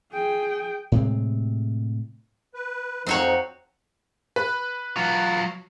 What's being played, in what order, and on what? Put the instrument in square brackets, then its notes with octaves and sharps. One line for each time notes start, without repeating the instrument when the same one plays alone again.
[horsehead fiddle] G#4 G5
[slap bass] A2 C3 G#3 C4
[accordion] B4
[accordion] F2 F3 D#4 [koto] C4 F#4 C#5
[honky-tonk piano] B4
[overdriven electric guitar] F#3 F4